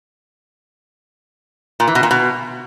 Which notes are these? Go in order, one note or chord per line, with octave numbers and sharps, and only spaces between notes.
A#2
E3
B2
A#2
B2